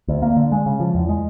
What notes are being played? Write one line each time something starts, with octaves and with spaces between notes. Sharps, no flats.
D2
A#3
D3
G#3
C#3
F3
E2
G#3